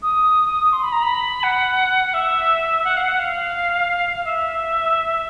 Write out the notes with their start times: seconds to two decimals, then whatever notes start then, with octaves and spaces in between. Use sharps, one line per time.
0.02 D#6
0.73 C6
0.83 B5
0.92 A#5
1.02 B5
1.43 F#5
2.14 E5
2.84 F#5
2.97 F5
3.02 F#5
3.19 F5
4.16 F5
4.25 E5